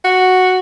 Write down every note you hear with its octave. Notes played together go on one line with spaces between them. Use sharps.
F#4